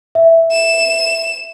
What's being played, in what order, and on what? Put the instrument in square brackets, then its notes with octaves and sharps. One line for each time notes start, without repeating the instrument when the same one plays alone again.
[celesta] E5
[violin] E7